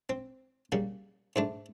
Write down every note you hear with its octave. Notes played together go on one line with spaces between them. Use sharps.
C4
C#3 G3 A#3
G#2 A3 D4